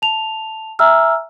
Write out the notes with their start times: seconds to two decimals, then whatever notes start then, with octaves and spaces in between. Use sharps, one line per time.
0.02 A5 F7
0.79 E5 G#5 A#5 E6 F6